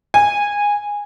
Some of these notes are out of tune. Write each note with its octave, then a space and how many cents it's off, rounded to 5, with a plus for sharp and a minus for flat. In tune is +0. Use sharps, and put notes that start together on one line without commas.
G#5 -15